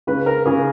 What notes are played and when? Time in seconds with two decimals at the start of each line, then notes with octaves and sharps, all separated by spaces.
0.07 C#3 B4
0.26 A#4
0.46 C#3 G#4